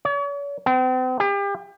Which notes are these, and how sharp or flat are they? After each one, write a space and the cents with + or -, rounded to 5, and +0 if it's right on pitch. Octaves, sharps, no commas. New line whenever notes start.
C#5 +45
C4 -40
G4 +35